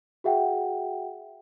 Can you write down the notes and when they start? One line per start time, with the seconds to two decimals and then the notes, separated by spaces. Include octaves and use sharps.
0.24 F#4 G#4 E5 F#5 G5